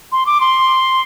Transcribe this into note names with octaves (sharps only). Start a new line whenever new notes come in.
C6
D6
C6